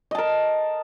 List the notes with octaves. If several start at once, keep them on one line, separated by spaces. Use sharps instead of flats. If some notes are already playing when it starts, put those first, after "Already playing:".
A#4 D#5 A5